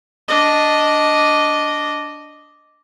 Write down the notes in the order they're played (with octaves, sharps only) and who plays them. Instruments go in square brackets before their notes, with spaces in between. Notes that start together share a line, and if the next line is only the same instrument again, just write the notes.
[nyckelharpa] D4 D#5